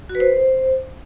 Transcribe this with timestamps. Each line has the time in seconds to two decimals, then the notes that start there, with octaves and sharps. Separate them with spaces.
0.09 F#4
0.15 B4
0.20 C5